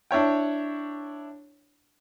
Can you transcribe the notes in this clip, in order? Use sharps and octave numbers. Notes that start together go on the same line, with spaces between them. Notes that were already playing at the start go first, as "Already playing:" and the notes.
D4 E4 C#5 G5